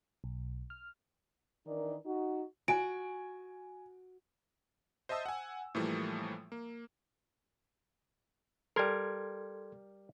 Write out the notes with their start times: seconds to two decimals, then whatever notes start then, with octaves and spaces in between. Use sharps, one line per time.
0.24 B1
0.70 F6
1.67 D#3 E3 D4 E4 A#4 D5
2.06 D#4 F#4
2.68 F#4 G#5 D7
5.09 C5 D#5 E5 A5 D#6 E6
5.26 F#5 G#5
5.75 A2 E3 F3 G3 A3 A#3
6.52 A#3
8.76 G3 A4 A#4 C6 G#6